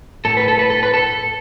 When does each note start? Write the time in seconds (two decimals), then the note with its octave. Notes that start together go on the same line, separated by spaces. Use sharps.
0.25 A2 A3 A4
0.37 B4
0.48 A4
0.59 B4
0.70 A4
0.83 B4
0.94 A4